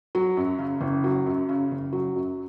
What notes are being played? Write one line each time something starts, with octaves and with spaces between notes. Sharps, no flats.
F#3
F#2
C#3
F#1
F#3
F#2
C#3
F#1
F#3
F#2